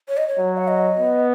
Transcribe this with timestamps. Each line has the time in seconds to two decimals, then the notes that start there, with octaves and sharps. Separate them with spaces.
0.09 C#5
0.17 D#5
0.28 C#5
0.38 F#3
0.57 F#5
0.69 D#5
0.98 B3